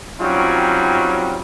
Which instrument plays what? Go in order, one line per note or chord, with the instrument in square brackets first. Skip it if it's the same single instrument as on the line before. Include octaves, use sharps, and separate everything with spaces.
[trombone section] F#3 G3 C4 C#4 D#4 F4